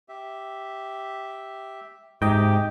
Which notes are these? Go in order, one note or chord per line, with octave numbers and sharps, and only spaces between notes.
G4 E5
G#2 C3 G4 D#5 G5